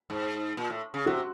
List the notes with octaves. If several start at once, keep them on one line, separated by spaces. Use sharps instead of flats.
G#2
A#2
A2
C#3
C3 F#4